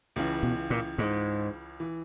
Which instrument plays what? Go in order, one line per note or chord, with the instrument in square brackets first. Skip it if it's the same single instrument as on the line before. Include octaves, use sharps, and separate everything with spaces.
[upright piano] C#2 C#3 E3
[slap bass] B2
A#2
G#2
[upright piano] E3